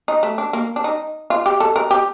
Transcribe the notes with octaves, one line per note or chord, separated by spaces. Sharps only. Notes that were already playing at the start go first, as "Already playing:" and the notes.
D#4
A3
D4
A#3
D4
D#4
F4
G4
A4
A#4
G4